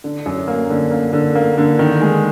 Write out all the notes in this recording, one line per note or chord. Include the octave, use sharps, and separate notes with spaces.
D3
F#2
A#3
D3
A#3
D3
A#3
D3
D#3
G#3